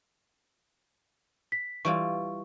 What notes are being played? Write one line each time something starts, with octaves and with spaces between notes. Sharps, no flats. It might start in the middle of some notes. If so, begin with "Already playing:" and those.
B6
E3 G3 F4 C#6